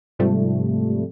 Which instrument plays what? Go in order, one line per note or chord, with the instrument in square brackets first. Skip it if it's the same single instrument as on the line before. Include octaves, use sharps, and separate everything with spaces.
[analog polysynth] G#2 C3 F3 G3 A3